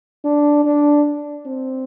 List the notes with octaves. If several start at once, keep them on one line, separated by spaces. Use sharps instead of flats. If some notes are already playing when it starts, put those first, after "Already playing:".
D4
D4
C4